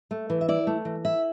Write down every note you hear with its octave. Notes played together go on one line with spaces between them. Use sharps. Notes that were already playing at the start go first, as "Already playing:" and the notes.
A3
E3
E5
E4 D5
A3
E3
E4 E5